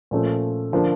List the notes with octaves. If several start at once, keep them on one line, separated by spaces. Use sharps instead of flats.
A#2 F3 A3 C#4
D3 F3 A#3 D4